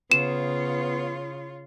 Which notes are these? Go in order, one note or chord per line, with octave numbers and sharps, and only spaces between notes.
C#3 B3 F4 C#5 E7